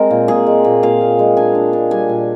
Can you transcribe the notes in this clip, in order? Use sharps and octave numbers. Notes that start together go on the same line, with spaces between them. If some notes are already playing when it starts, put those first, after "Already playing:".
Already playing: G#3 C4 A#4
A#2
A#2 G#4
G#3
A#2
A#2 F5
A#2
G#3
D4 G#5
D4
D4
G3 G#5
A#2